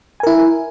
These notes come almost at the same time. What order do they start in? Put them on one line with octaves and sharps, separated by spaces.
G#5 A#4 E4